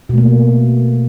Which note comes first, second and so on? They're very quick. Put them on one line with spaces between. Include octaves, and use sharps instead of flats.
B2 A3 A#3